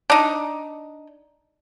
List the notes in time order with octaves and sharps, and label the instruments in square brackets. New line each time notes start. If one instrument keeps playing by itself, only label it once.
[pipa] D4 D#4